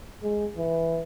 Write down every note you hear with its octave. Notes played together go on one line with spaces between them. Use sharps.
G#3
E3